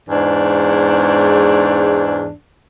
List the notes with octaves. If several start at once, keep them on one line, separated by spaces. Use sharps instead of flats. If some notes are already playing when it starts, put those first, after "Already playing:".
E2 G#2 D4